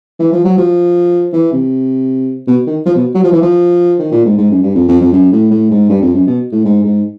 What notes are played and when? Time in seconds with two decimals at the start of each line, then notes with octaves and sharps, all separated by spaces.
0.20 E3
0.32 F3
0.44 F#3
0.58 F3
1.33 E3
1.52 C3
2.47 B2
2.67 D#3
2.86 F3
2.95 B2
3.14 F#3
3.23 F3
3.32 E3
3.42 F3
3.99 D#3
4.12 A#2
4.25 G#2
4.38 G#2
4.51 F#2
4.63 G2
4.75 F2
4.88 F2
5.01 F2
5.13 F#2
5.32 A2
5.51 A2
5.71 G#2
5.89 G2
6.02 F2
6.14 F#2
6.27 B2
6.52 A2
6.65 G#2
6.84 G#2